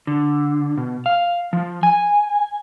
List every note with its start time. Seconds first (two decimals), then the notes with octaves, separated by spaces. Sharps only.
0.07 D3
0.78 B2
1.06 F5
1.53 F3
1.83 G#5